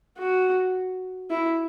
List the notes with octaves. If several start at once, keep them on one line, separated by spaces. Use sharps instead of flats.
F#4
E4